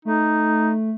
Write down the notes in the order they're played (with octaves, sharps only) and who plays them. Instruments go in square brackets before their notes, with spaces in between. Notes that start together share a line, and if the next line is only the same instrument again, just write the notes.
[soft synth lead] A3 [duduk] D#4